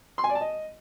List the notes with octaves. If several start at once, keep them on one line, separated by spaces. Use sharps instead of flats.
C6
G#5
D5
A5
D#5